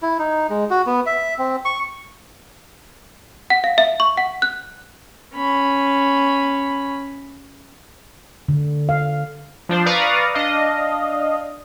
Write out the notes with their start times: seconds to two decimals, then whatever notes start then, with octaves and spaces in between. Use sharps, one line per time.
0.02 E4
0.19 D#4
0.50 G#3
0.70 F#4
0.87 B3
1.06 E5
1.38 C4
1.65 C#6
3.50 F#5
3.64 F5
3.78 E5
4.00 C#6
4.17 F#5
4.42 F#6
5.35 C#4 B5
8.48 D3
8.89 F5
9.69 F3 D4 C5
9.86 B4 D5 F5 A#5 C#6 D#6
10.34 D4 D#5 F5